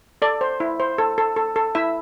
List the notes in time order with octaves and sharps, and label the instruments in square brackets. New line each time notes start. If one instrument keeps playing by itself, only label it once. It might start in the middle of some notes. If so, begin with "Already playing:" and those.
[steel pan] A4 D5
C5
E4
C5
A4
A4
A4
A4
E4 E5